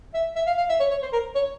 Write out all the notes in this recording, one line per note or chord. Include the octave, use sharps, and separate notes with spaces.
E5
E5
F5
F5
E5
C#5
C#5
C5
A#4
C#5